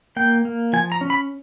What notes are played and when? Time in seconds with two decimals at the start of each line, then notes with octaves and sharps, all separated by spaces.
0.16 A#3 G5
0.45 A#3
0.73 F3 G#5
0.92 A#5
1.01 C#4
1.10 B5